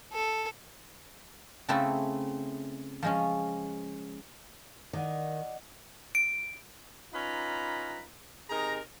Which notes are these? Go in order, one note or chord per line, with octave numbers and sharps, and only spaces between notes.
A4
C#3 A3 C4 E4 A4
F3 G#3 C#4
D#3 D5 D#5 F#5
D7
C#4 D#4 F4 B4 A#5 B5
C3 D#4 G#4 A#4 A#5